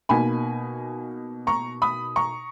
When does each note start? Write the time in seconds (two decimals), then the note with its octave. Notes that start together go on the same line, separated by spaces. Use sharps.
0.09 B2 A#3 D#4 G#5 B5
1.47 A#5 C#6
1.82 B5 D#6
2.16 A#5 C#6